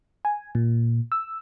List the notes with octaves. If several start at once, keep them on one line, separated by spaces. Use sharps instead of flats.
G#5
A#2
E6